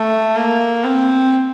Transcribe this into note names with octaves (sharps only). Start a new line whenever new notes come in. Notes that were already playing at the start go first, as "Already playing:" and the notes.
Already playing: A3
A#3
C4